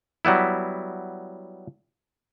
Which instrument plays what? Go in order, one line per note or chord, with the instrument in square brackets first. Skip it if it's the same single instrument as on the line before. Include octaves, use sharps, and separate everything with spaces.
[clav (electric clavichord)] F#3 G3 B3 E4